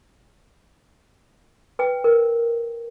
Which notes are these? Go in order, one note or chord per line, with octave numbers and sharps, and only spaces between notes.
B4 G5
A#4